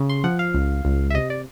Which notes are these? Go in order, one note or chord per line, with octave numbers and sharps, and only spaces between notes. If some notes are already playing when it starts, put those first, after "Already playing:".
Already playing: C#3
C6
F3 F#5
F5
C#2
C#2
E5
C3 D#5
D5